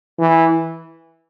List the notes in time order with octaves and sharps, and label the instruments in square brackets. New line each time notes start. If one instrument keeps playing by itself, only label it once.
[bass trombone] E3